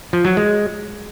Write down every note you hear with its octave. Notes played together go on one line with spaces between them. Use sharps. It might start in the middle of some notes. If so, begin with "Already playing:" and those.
F3
F#3
G#3